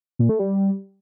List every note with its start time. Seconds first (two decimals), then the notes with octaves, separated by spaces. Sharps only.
0.19 A#2
0.29 A3
0.39 G3